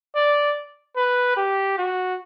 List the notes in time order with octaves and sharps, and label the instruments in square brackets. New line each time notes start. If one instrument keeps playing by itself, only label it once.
[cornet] D5
B4
G4
F#4